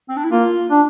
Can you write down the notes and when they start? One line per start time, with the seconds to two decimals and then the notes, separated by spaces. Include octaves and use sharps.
0.09 C4
0.16 D4
0.24 E4
0.31 A#3 F4
0.70 D4